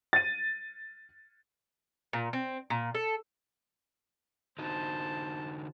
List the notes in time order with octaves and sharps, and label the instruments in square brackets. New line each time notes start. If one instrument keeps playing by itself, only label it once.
[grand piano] A6 D#7
[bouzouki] A#2
C4
A#2
A4
[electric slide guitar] D3 D#4 F#4 [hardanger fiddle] C5 A5